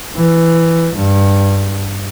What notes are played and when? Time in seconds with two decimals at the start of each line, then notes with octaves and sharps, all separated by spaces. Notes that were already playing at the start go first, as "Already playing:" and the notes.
0.16 E3
0.96 G2